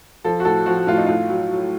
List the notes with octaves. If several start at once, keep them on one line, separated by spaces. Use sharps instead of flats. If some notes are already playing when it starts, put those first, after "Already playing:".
F3 A4
F#4
A2 A4
F3 F#4
A2 F4
D#4
A2 F4
F#3
F#3